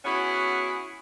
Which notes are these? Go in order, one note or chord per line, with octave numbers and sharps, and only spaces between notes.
B3 C#4 E4 F#4 G#4